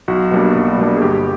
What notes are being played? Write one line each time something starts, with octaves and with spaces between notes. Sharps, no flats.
B1 F#4
B2 G3 A#3 D4
B1
B2 G3 A#3 D4
G#4
G1 G4